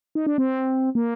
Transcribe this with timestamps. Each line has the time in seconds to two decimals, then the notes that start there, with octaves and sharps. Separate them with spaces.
0.15 D#4
0.27 D4
0.38 C4
0.95 A#3